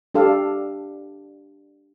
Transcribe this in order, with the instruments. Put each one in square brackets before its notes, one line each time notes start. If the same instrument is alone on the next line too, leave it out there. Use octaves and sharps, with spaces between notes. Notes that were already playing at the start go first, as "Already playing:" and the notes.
[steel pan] D4 G4 A4 F5